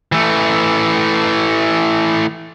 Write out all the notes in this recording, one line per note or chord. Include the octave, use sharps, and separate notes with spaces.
E3 A3